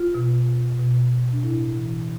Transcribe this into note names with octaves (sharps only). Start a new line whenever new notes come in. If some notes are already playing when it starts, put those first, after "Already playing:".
Already playing: F4
B2
B2
D4
A2 E4
E3